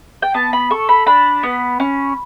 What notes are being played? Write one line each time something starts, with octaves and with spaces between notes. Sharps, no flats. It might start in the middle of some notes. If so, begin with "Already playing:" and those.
G5
B3 A5
B5
A4 C#6
B5
D4 B5
B3
C#4